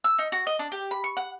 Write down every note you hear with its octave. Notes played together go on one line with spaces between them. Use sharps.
E6
D#4
F#4
D#5
D4
G4
B5
C#6
F#5